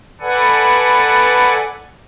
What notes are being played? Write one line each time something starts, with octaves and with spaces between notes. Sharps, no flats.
A4 B4 D5 F#5 G#5